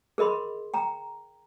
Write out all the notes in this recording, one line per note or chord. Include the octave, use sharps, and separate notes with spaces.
G#4 A#4 D#5 B5 C6
G5 A#5